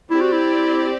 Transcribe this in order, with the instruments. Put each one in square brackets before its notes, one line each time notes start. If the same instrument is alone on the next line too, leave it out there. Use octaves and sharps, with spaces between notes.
[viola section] C4 G4 D5 [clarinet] E4
[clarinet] F#4
E4